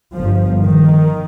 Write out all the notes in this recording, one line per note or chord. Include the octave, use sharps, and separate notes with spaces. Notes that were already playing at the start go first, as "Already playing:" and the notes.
G1 G2 F3
D#3